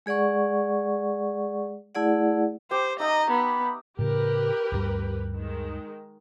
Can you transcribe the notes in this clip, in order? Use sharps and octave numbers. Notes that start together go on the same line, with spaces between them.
G#3 G#4 D5 F#5 C#6
A3 E4 G#4 D5 F#5
G4 C5 G5
D#4 D#5 E5 A#5
B3 B5
A2 C#3 G4 A#4 B4
D2 G2 G3
D#3 G#3